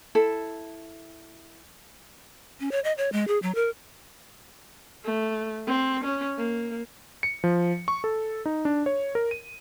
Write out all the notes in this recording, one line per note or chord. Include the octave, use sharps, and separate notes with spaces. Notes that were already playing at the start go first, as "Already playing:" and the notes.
E4 A4
C#4
C#5
D#5
C#5
G#3
G#4
F#3
A#4
A3
C4
C#4
A#3
C#7
F3
C#6
A4
D#4
D4
C#5
A#4
D#7